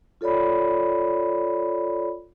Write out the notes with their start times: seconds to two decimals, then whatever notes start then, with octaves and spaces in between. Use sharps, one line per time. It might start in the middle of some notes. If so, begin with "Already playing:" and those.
0.21 F4 A4 C#5 D5 B5